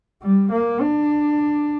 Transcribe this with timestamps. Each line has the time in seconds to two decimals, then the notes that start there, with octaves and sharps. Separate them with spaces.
0.22 G3
0.51 A#3
0.81 D4